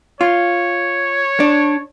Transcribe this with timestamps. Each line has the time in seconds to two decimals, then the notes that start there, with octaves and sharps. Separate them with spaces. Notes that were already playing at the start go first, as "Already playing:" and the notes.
0.21 F4 C#5
1.40 D4